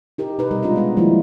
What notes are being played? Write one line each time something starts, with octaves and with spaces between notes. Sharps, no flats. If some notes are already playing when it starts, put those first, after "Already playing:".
D#4 G4 A#4
B2 D#4 B4
C3 G3 A#4
G#3 D4 F4 D#5
G#3 B3 D5
D#3 F3 G3 G#3 A#3 E4